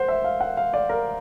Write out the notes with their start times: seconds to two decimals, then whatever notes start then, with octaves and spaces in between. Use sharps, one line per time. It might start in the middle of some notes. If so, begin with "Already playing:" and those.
Already playing: C5 F#5
0.08 E5
0.24 F5
0.40 F#5
0.57 F5
0.74 D5
0.89 A#4